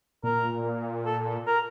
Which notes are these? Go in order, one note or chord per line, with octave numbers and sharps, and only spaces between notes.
A#2 A#4
A4
A#4